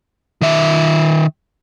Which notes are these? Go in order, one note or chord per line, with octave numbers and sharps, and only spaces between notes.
D#3 E5